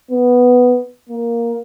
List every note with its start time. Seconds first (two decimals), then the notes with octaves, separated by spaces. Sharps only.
0.11 B3
1.09 A#3